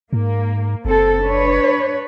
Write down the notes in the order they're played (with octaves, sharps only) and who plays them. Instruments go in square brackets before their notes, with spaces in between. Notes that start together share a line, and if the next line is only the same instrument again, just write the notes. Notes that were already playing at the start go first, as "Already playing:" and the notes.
[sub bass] G#2 [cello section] A#3
[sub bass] F#1 [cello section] C4 A4
[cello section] D4 B4 C#5